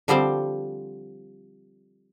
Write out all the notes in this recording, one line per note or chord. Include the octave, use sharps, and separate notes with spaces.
D3 F3 G3 C4 C5 D5